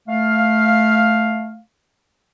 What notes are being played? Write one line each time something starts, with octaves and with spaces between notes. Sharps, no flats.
A3 F5